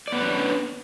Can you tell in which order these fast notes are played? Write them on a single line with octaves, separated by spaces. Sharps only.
D5 B3 B4 C#4 D4